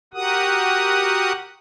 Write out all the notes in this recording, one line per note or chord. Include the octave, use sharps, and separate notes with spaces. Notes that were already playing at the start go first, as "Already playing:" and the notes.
F#4 G4 A#4 F#5 D#6